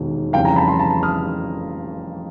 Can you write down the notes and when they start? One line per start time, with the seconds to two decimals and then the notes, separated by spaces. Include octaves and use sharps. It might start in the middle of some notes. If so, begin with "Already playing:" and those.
Already playing: E1 D#2 D#3
0.33 F1 F2 C#3 E3 G3 F5 G5
0.45 G#5 A#5
0.56 A5 B5
0.68 A#5 C6
0.79 A5 B5
1.03 D#6 F6